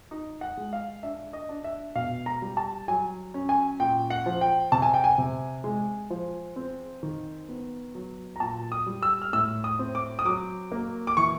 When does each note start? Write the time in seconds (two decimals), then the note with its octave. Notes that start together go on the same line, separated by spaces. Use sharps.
0.11 D#4
0.41 F#5
0.57 G#3
0.73 F5
1.03 D4 E5
1.33 D#5
1.49 D4
1.64 E5
1.95 B2 F5
2.26 A#5
2.42 G3
2.57 A5
2.88 F#3 G#5
3.34 C#4
3.49 G#5
3.80 A#2 G5
4.10 F#5
4.26 F3
4.41 G5
4.72 C3 A5
4.82 G#5
4.94 G5
5.04 G#5
5.18 C3
5.64 G#3
6.10 F3
6.56 C4
7.03 D#3
7.49 B3
7.95 F#3
8.36 A#5
8.40 A#2 A5
8.72 D#6
8.86 G3
9.03 E6
9.22 F6
9.33 A2 E6
9.64 D#6
9.79 C4
9.95 D6
10.19 D#6
10.25 F#3 D6
10.72 A#3
11.07 D6
11.17 E3 C#6